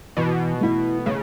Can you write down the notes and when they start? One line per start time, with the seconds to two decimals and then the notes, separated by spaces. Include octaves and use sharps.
0.17 B2 E3
0.60 A3 E4
1.06 C#3 A3